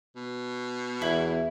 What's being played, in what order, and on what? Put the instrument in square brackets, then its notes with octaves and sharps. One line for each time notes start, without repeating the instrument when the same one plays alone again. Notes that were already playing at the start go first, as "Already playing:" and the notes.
[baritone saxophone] B2
[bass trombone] E2 [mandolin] E4